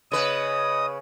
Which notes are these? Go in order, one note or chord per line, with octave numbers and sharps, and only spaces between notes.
C#3 B4 D#5 D#6